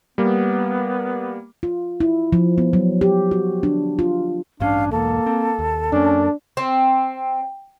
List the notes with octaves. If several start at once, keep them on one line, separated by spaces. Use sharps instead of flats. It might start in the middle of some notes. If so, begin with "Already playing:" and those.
G3 A#3 B3
F4
E4
F3
B3
F#3
G4
F#4
D4
F4
A1 G2 C#4 D4 F5
B1 E2 G#2 A#3 A4
C4
D#2
F#2 A#3 C#4 D4
C4